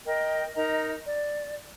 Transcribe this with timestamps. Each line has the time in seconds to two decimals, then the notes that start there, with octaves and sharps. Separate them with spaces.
0.05 A#4 D#5 G5
0.55 D#4 A#4 D#5 A#5
1.06 D5